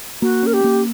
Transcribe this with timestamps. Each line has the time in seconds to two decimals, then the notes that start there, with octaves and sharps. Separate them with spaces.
0.22 A#3 F#4
0.43 C#4 A#4
0.53 G4
0.64 A#3